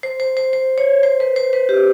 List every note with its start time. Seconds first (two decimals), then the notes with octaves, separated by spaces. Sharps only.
0.03 C5
0.20 C5
0.37 C5
0.53 C5
0.78 C#5
1.03 C5
1.20 B4
1.36 C5
1.53 B4
1.69 G4